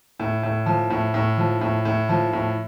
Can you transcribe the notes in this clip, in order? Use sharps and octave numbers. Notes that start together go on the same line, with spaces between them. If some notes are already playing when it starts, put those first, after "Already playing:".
A2
A2
F3
A2
A2
F3
A2
A2
F3
A2